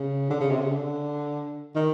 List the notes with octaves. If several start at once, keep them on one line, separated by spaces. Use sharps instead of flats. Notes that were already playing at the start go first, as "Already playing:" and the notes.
Already playing: C#3
D3
C#3
C3
C#3
D3
D#3